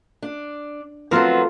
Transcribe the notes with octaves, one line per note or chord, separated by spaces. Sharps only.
D4
F#3 A3 B3 C4 F4 A#4